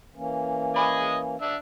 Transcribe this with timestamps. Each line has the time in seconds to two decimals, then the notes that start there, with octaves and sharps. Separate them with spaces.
0.16 E3 A#3 C#4
0.76 D#5 G#5 B5 C#6 D6
1.41 D4 E5